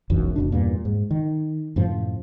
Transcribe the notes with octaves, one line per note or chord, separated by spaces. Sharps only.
E1 B1 F#2 E3
F1 B2 D4
E2 G2 A#2
G#2
D#3
F#2 A2 C3 F3